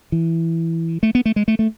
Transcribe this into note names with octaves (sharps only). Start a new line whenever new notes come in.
E3
A3
B3
A3
G#3
A3
A3